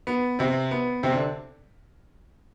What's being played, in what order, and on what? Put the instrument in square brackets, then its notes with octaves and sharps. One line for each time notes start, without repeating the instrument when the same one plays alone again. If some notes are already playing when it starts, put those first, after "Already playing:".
[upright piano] B3
C3 C4
B3
C3 C4
D3 D4